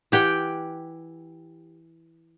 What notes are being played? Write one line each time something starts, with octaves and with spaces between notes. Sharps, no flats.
E3 G4 F#5 G5